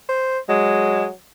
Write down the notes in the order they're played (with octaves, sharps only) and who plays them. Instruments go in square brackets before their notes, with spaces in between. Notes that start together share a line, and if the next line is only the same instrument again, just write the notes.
[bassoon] C5
[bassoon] F#3 [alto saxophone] G#3